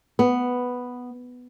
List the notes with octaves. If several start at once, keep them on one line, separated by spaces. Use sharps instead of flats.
B3